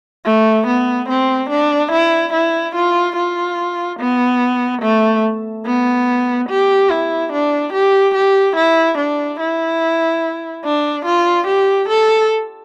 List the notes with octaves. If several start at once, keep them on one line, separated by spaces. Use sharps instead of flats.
A3
B3
C4
D4
E4
E4
F4
F4
B3
A3
B3
G4
E4
D4
G4
G4
E4
D4
E4
D4
F4
G4
A4